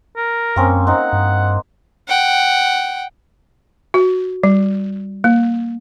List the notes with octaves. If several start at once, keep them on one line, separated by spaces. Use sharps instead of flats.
A#4
F#2 A#3 C4 C#4
C4 D#4 F#5
G2
F#5 G5
F#4
G3
A#3